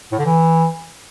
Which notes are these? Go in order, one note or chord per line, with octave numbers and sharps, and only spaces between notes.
A2
D3
E3